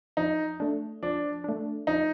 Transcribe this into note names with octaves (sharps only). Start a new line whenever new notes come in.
F3 D#4
A3 D4
F3 D4
A3 D4
F3 D#4